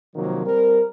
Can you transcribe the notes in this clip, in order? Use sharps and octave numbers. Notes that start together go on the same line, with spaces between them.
C3 D#3 F3 F#3 A#3
G3 C4 A#4